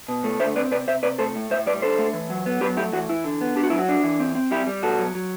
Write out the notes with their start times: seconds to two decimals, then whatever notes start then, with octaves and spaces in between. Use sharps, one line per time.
0.08 B2
0.24 A3
0.39 D3 C5 E5
0.56 C4 B4 D5
0.71 C3 B4 D5
0.88 C3 C5 E5
1.03 C3 B4 D5
1.18 A3 A4 C5
1.35 A2
1.50 A2 C5 E5
1.66 G3 B4 D5
1.82 D3 A4 C5
1.99 A3
2.13 E3
2.30 F#3
2.46 B3
2.61 F#3 G4 B4
2.77 A3 E4 G4
2.93 E3 F#4
3.09 E3 E4
3.24 D3
3.41 B3
3.56 D4 G4
3.63 F#4
3.70 F#3 E4
3.79 F#4
3.89 D4
4.04 E3
4.20 C4
4.35 C4
4.51 G3 E4 G4
4.67 G3
4.82 B2 F#4 A4
4.98 F#3
5.15 F#3